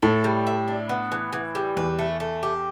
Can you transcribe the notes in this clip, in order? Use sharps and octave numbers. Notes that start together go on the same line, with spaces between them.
A2 A4
G3
E5
D4
B3
E3
E3
G3
E2 B4
A3
A3
G4